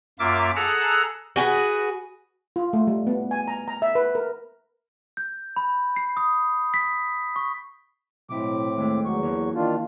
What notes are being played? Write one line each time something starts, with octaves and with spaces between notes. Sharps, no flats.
F#2 A#3 F4 E5 D6
G#4 A4 F#5 A#5 E6 F#6
F#4 G#4 A4 B4
F4
A3
G3
B3
G#5
A#5
A#5
E5
B4
A#4
G6
B5
C7
D#6
B6
C#6
B1 A2 C4 E4 D6
D#2 G#3 A3
E2 F#3 C#6
E3 A#3
D#3 D4 F4